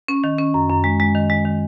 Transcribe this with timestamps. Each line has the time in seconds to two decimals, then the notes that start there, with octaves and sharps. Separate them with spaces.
0.08 C#4
0.24 D#3
0.38 C#4
0.54 F#2
0.70 F#2
0.84 G#3
1.00 G#3
1.15 D#3
1.30 G#3
1.45 D#3